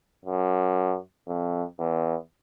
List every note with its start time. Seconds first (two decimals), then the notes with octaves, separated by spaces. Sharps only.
0.25 F#2
1.27 F2
1.79 E2